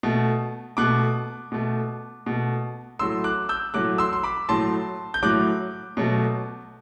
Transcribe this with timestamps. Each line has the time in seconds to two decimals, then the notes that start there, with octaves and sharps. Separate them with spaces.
0.03 B2 A3
0.77 B2 A3 D6 F#6
1.52 B2 A3
2.26 B2 A3
2.99 A2 F#3 A3 C6 E6
3.24 D6 F#6
3.49 E6 G6
3.74 A2 F#3 A3 D6 F#6
3.98 C6 E6
4.13 C6
4.23 B5 D6
4.49 A2 F#3 A3 A5 C6
5.14 G6
5.23 A2 F#3 A3 D6 F#6
5.97 B2 F#3 A3